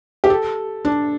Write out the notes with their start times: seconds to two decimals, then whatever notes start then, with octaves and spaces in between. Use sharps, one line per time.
0.24 G4
0.30 A4
0.85 D4